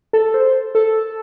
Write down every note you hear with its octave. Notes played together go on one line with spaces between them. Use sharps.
A4
C5
A4